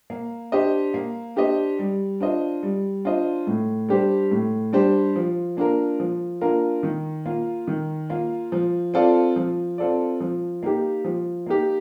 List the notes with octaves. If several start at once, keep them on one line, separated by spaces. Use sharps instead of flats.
A#3
D4 G4 C5 D#5
A#3
D4 G4 C5 D#5
G3
D4 F4 C5 D#5
G3
D4 F4 C5 D#5
A2
G3 D4 G4 C5
A2
G3 D4 G4 C5
F3
A#3 D4 F4 A#4
F3
A#3 D4 F4 A#4
D#3
A#3 F4
D#3
A#3 F4
F3
C4 F4 A4 D5
F3
C4 F4 A4 D5
F3
A#3 D#4 G4
F3
A#3 D#4 G4